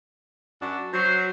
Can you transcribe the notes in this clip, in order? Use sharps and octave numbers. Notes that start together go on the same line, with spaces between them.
F#2 D4 F#4
F#3 C5